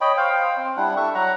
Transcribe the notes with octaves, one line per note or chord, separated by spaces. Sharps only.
C#5 D#5 G5 B5
C5 F5 G5
C4
G3 D4 E4 F#5
A4 E5 C#6
F#3 F#5 A#5